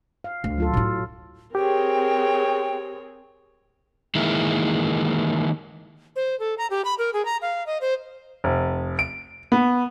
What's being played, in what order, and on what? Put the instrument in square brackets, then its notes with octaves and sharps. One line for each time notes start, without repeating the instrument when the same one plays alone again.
[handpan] F5
[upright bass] D2
[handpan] F#3 F4 A4
[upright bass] A2 E4
[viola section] C4 G#4 [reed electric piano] G4 [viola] A#4 C#5 [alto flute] G5
[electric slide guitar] D#3 E3 G#3 A#3 E4
[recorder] C5
A4
A#5
G4
B5
A#4
G#4
A#5
F5
D#5
C5
[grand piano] F1
D7
B3